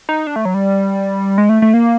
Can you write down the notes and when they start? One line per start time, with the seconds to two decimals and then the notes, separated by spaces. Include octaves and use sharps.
0.09 D#4
0.27 D4
0.36 A3
0.45 F#3
0.54 G3
1.38 G#3
1.49 A3
1.62 A3
1.74 A#3